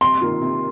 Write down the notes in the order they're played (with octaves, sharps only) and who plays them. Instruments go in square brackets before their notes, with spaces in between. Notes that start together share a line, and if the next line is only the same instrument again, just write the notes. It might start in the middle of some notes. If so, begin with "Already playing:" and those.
[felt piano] C3 [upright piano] C6
[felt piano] D#3 A#3 F4
C3